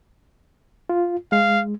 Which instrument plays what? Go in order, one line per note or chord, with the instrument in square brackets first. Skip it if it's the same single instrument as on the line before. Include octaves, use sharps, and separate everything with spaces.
[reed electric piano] F4
[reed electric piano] G#3 [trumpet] F5